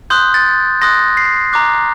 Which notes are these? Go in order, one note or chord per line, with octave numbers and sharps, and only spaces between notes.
C6 D#6 F#6 G6
A6
C6 D#6 F#6 A#6
C7
A#5 D6 F#6